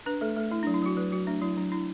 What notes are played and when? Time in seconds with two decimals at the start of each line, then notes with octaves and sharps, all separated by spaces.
0.06 D4 B4
0.21 A3 A4
0.36 A3 A4
0.51 A3 E4
0.63 D4
0.67 F#3
0.74 E4
0.82 F#3 F#4
0.97 F#3 B4
1.12 F#3 F#4
1.27 A3 D4
1.42 F#3 E4
1.57 F#3 D4
1.72 D4 E4